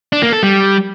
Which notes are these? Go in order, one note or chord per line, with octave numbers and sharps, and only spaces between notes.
D4
A#3
A4
G3